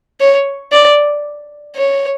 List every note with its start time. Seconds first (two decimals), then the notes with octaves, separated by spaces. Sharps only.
0.20 C#5
0.72 D5
1.76 C#5